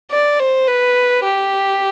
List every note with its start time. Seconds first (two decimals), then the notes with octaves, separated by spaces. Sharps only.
0.11 D5
0.39 C5
0.67 B4
1.24 G4